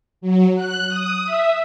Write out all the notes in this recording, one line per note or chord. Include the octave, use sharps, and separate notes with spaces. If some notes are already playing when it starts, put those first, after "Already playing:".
F#3
F#6
D#6
E5